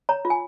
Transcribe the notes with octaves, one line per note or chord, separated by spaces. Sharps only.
C#5 A#5
F4
G#5